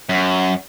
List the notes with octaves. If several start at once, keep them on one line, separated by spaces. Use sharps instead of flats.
F#2